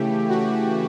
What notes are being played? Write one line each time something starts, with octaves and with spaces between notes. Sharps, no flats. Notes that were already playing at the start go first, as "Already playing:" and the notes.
Already playing: C#3 E3 A3 G4
F#4